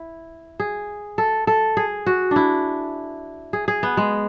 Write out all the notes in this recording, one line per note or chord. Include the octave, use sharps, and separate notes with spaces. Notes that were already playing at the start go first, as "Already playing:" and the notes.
Already playing: E4
G#4
A4
A4
G#4
F#4
D4 E4
G#4
G#4
B3
G#3